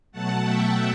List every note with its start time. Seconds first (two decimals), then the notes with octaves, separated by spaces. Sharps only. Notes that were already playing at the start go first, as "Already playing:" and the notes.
0.11 B2 F#3 A3 F#5 A5
0.42 E5 G5